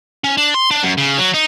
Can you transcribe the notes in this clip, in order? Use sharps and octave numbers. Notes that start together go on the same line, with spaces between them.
C#4
D4
C6
D4
F#2
C#3
F#3
D#4